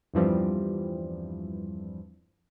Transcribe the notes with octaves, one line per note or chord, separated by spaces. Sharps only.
E2 G2 E3 F3 G3 C4